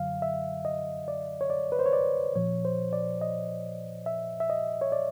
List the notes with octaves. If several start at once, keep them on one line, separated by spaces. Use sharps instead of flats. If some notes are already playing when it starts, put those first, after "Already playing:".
Already playing: F#2 D3 F#3 F5
E5
D#5
D5
C#5
D5
B4
C5
C#5
D5
A#2 F3 C#5
C5
D5
D#5
E5
E5
D#5
C#5
D5